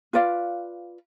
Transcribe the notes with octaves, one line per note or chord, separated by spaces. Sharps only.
F4 B4 D5 F5